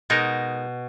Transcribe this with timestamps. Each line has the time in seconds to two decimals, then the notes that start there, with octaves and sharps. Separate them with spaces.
0.10 B2 G#3 D#4 A#4